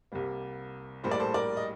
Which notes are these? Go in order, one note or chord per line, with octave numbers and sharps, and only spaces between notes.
C2 C3 G3 A#3
A#1 A2 G3 A#3 C5
D5
A4 C5
A#4 D5
D#5